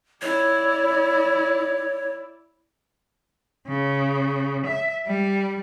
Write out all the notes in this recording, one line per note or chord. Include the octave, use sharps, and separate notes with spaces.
E4 C#5 D5
C#3
E5
G3